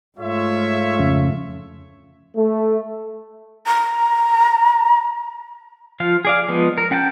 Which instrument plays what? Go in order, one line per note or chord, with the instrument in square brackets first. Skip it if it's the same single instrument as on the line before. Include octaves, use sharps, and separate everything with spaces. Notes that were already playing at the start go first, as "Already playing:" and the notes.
[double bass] G#2 A3 [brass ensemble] F4 C#5 E5
[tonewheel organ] F2 C#3
[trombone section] A3
[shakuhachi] A#5
[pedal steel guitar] F3 F4 F5
G#4 D5 F5
F3 G#3 B3
A#4
C#4 F#5 G5 A5 G6